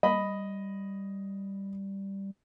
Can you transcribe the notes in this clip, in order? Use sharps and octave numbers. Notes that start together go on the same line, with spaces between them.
G3 D#5 B5